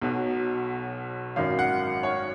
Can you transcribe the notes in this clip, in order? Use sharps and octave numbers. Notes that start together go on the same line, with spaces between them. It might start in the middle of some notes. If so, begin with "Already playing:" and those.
B1 B2 F#3
G#1 F#2 D#3 F5
F#5
C#5